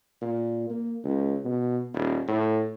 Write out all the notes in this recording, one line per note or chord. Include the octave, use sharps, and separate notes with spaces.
A#2
A#3
C#2
B2
D#1
A2